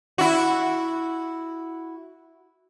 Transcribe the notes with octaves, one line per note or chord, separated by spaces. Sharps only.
E4 F#4